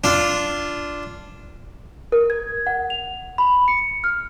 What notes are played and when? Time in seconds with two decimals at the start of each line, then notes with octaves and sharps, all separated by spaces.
0.04 D4 F4
2.12 A#4
2.30 G#6
2.67 F#5
2.90 F7
3.38 B5
3.68 C#7
4.04 F6